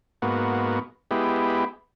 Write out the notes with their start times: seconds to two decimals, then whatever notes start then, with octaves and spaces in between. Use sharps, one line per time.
0.22 G#2 A#3 B3 F#4
1.11 G#3 B3 E4 G4